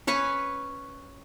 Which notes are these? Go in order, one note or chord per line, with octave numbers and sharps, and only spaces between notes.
C#4 B4 G#5 C#6